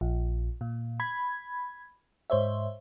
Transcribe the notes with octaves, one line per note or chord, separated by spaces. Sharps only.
A#1
A#2
B5 G#6
G#2 C5 C#5 E5